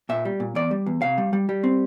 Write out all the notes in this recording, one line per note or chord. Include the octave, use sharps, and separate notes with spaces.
A#2 E5
G3
A#2
E2 D5
G3
E2
C3 F5
G3
G3
G3
C4